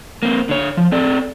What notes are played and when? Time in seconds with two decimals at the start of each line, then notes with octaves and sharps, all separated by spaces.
0.23 A#3 C4
0.49 D3 C#5
0.77 F3
0.92 C4 A4 D5